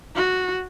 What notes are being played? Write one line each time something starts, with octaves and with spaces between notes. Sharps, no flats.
F#4